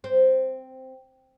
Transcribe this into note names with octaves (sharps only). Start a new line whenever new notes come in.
C4